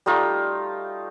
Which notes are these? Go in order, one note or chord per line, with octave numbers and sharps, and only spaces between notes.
G3 A3 D#4 F4